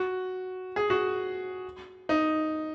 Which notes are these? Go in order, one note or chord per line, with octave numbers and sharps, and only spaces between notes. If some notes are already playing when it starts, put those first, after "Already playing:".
Already playing: F#4
G#4
F#4
D#4